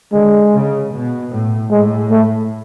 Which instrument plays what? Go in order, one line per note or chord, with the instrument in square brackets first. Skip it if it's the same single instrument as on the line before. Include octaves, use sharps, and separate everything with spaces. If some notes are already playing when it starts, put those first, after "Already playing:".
[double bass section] D3 [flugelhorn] G#3
[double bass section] C#3
B2
A2
[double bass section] A2 [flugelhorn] G#3
[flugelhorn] A3